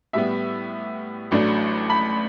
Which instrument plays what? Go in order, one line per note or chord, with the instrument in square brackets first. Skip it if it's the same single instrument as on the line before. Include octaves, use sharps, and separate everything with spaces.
[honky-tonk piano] A2 G3 B3 E5
A1 A2 F#3 A3 D4
B5